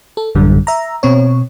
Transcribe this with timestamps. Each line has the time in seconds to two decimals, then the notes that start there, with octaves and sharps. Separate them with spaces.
0.17 A4
0.35 A1 F#2 D3 G3
0.67 E5 A#5
1.03 B2 C4 C#5